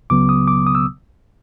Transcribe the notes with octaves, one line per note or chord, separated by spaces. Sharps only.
C#2 C#3 F#3 B3 D6
D#6
D6
D#6
E6